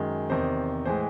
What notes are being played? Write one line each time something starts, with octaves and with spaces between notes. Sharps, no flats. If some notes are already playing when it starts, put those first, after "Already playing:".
Already playing: F#2 D#3 G#3
E2 C3 D#3 C5
A2 E3 G#3 C5